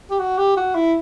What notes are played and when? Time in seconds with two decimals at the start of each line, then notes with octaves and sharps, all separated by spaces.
0.10 G4
0.19 F#4
0.38 G4
0.57 F#4
0.75 E4